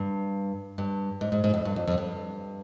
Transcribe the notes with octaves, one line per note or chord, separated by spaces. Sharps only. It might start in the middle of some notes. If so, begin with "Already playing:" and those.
Already playing: G2
G2
G#2
G#2
G#2
F2
G2
F2
F2
G2